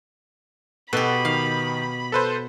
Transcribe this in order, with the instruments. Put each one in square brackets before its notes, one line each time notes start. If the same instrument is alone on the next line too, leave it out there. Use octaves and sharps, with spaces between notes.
[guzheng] B2 G4 [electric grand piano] A4 [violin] B5
[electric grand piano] D#3 [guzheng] F5
[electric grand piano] A4 B4 C5